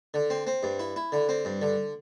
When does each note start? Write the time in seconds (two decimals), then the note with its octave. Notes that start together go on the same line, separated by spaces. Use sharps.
0.14 D3
0.30 C4
0.47 C4
0.63 G2
0.79 E4
0.96 E4
1.12 D3
1.29 C4
1.45 G2
1.62 D3